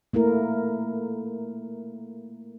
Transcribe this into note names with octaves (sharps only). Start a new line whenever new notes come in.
A3 A#3 E4 A#4